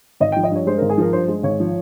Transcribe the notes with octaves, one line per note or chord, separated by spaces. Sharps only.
G#1 D#5
F3 G5
D#5
G2 C#5
G#3 C5
G#1 A#4
G#4
F3 A#4
G2 C5
G#3
G#1 C#5
F3